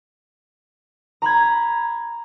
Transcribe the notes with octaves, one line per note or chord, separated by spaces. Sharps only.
A#5 B5 G#6